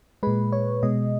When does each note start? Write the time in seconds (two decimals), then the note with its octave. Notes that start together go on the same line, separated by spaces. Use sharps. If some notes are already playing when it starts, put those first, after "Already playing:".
0.23 A#2 G#3 B4
0.52 C#5
0.83 B2 G#3 D#5